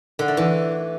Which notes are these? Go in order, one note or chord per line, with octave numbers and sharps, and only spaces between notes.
D3
A3
E3